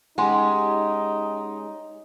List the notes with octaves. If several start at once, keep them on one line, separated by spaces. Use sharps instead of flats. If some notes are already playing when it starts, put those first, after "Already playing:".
G#3 C#4 D#4 G4 F#5 G#5 C6